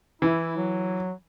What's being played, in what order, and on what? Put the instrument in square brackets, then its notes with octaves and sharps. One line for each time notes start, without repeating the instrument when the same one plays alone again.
[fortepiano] E3 [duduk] E4
[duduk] F#3